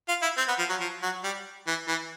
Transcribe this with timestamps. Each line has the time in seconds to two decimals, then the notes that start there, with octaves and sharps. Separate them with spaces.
0.09 F4
0.22 E4
0.38 C4
0.48 B3
0.59 F3
0.70 F#3
0.80 F3
1.02 F#3
1.24 G3
1.67 E3
1.88 E3